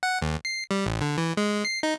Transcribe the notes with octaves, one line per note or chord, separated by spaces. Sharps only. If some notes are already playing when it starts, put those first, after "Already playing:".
F#5
D#2
C7
G3
A1
D3
E3
G#3
C7
D#4